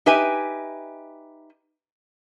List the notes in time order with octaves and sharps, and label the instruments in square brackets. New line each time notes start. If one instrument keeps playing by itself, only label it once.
[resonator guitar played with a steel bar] D#4 G4 B4 E5 G#5